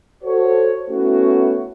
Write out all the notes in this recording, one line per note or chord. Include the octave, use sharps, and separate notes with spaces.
F#4 A4 C5 C#5
A3 B3 C#4 E4 F#4